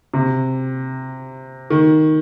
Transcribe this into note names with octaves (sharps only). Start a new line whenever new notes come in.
C3
D#3